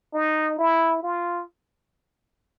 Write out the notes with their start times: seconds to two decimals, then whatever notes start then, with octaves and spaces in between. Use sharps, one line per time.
0.14 D#4
0.58 E4
1.03 F4